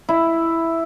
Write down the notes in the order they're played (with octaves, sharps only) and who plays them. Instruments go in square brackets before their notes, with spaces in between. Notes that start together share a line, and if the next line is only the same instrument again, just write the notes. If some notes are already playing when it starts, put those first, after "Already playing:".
[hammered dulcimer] E4